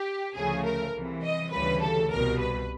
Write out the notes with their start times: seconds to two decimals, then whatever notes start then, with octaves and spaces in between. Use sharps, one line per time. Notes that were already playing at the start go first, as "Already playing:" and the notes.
Already playing: G4
0.35 D2 C#3 F3 A3 G#4
0.64 A#4
0.93 C2 C3 E3
1.23 D#5
1.51 D2 C#3 E3 G3 B4
1.81 A4
2.10 C2 B2 G3 A#4
2.40 B4